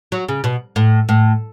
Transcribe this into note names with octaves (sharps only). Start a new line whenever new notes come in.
F#3
C#3
B2
A2
A2